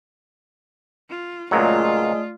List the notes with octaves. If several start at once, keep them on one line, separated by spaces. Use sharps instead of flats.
F4
C#2 A#2 F#3 G#3 A3 F4 D5 D#6